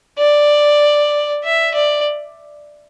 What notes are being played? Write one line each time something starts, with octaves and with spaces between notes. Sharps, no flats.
D5
E5
D5